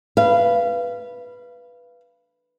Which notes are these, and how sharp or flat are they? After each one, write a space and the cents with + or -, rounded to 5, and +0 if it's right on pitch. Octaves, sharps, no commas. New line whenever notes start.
B4 -5 F5 -25